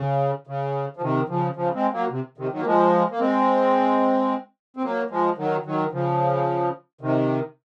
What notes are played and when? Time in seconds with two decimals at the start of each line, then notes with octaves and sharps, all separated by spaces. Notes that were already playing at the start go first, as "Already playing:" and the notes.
Already playing: C#3
0.47 C#3
0.97 F3
1.02 C3 D#3
1.29 C#3 F3
1.56 C#3 F3
1.74 G#3 C4
1.92 F#3 A#3
2.11 C3
2.38 C3 D#3
2.52 D#3 F#3
2.59 A#3
2.65 F3 G#3
3.11 A#3
3.19 G#3 C4
4.77 C4
4.83 F#3 A#3
5.10 F3 G#3
5.37 D#3 F#3
5.66 D#3 F#3
5.92 C#3 F3
7.01 C3 D#3